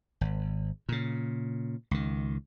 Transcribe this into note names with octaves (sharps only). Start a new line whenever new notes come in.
G#1
A#2 C#3
C#2 D#3